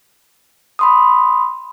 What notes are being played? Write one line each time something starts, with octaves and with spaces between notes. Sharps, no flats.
B5 C6 D#6